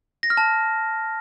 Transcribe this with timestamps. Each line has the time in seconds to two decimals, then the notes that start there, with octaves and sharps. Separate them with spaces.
0.23 A#6
0.30 F6
0.37 A5